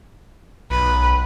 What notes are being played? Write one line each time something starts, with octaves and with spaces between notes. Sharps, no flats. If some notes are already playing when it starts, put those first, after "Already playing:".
B1 B4